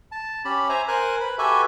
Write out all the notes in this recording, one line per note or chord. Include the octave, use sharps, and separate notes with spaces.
A5
C#4 G4 B5
C5 E5 G#5 A#5
A#4 C5 G#5 F#6
B4 B5
F#4 G4 A4 B4 E5 G#5